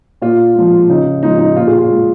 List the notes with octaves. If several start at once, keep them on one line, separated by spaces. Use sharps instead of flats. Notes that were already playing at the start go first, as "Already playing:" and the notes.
A#2 F4
F3 G#3
C#3 D#4
F3 G#3 D#4
D#4
A#2 F4
G#4
F4
G#3